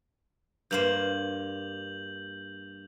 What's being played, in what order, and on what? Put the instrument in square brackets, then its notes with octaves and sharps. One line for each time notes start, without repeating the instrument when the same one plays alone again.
[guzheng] G2 A#3 C5 [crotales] G6 F7 F#7